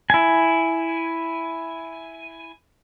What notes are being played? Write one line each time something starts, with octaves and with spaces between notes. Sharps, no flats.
E4 G#5